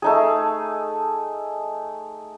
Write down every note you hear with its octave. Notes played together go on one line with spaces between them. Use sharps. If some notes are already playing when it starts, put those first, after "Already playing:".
A3 D#4 G#4